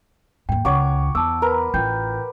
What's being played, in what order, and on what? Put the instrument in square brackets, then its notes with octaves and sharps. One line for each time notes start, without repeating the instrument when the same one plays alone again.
[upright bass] D#2 G#2 [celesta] G5
[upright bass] C#2 [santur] C#5 F#5 D6
[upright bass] E2 [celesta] A5 E6 [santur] D6
[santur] A#4 B4
[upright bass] A1 F4 [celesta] G5 G6